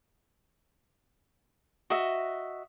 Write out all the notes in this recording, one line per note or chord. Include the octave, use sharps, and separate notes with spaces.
F#4 D#5 E5